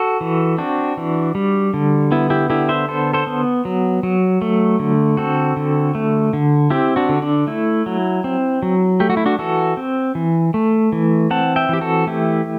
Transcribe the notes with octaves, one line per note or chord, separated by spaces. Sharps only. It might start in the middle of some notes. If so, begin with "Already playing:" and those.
Already playing: F#4 A4
E3
C4 D4 F#4
E3
G3
D3
B3 E4
E4 G4
D3 E4 G4
C5 E5
B3 A4 C5
A4 C5
B3
F#3
F#3
A3
D3
C4 F#4 A4
D3
A3
D3
C4 E4 G4
D4 F#4
D3
D4
A3 E4
F#3
C4
F#3
A3 G4
F#4
E4
D4 F#4
E3 F#4 A4
C4
E3
A3
E3
C4 F#5 A5
E5 G5
E3 G4
F#4 A4
A3 E4 G4